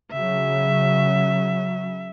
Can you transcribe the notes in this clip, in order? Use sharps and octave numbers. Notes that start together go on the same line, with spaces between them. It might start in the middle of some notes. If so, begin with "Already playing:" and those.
C#3 F#3 E5